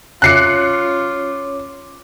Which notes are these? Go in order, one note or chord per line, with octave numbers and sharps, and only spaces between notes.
C#4 F4 C#5 D6 F#6 C7 C#7